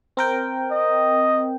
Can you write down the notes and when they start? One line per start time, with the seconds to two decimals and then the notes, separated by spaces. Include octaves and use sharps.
0.17 C4 A#4 G5
0.71 D#5